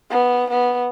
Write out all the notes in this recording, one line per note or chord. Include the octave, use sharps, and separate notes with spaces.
B3
B3